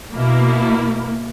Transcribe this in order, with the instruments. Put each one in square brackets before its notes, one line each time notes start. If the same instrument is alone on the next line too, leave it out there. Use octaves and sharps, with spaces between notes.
[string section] B2 A#3 E4